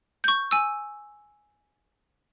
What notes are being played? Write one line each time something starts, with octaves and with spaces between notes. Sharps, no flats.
C#6 G6
G#5 E6